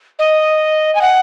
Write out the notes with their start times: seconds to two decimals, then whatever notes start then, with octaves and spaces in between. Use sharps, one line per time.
0.19 D#5
0.95 G#5
1.01 F#5